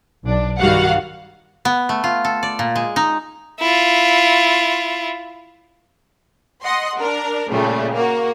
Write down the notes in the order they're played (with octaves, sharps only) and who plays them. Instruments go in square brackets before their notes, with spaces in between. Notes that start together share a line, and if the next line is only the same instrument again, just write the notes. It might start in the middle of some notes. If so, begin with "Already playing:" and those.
[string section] B1 D4
G2 D#3 G3 F#4 F5 F#5
[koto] B3
A3
F4
A4
D5
A#2
G#3
D#4
[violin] E4 F4
[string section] D#5 F#5 C6
D4 A#4
A#2 C#3 G3 A3
A#3 F#4